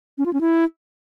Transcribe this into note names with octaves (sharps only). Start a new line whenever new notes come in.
C#4
F4
C#4
E4